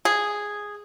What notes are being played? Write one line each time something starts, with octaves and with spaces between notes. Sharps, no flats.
G#4